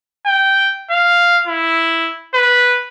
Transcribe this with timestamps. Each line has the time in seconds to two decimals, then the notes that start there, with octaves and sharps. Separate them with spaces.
0.26 G5
0.91 F5
1.47 E4
2.34 B4